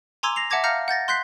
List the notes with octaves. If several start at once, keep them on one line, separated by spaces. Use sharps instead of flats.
G#5 A#5 C6 D6 E6 G#6
A#6 C7 F7
E5 F#5 A5 D6 G#6 A#6
F5 A#5 F6 G6 A#6 C#7
F#5 G6 A6 A#6
C6 F#6 G6 B6 C7